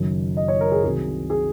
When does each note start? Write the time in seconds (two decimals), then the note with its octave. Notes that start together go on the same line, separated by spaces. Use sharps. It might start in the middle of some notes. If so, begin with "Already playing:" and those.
Already playing: F#1 F#2 D#3 F#3
0.37 D#5
0.48 C#5
0.61 A#4
0.72 G#4
0.84 C2 C3 D#3 F#3 G#4
1.30 G#4